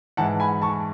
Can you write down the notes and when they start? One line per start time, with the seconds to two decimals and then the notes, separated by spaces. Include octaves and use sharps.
0.17 G#2 E3 F#5 A5
0.40 G#5 B5
0.62 A5 C#6